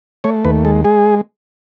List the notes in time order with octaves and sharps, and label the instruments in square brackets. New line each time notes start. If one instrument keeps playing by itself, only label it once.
[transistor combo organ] A3 C#5
D#2 B4
G#3 A4
G#3 G#4